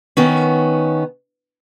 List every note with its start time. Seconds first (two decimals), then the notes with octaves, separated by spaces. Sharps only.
0.17 D#3 B3 C#4